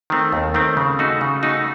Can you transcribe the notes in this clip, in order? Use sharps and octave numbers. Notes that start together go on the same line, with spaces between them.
D#3 A3 C4
D#2
D#3 A3 C4
C#3
A3 D#4 F#4
C#3
A3 D#4 F#4